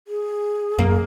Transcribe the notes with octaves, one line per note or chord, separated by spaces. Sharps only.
G#4
F#2 A#3